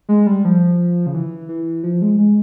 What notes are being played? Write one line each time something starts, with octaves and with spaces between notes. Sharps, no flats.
G#3
G3
F3
C#3
E3
E3
F3
G#3
G#3